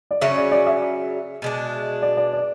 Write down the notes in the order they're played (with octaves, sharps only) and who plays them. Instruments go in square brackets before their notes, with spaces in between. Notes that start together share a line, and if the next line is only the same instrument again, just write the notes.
[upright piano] D5
[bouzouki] C#3 F#3 C#4 [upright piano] E5
[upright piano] D5
D5
E5
[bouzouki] B2 G#3 D4
[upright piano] D5
D5
D5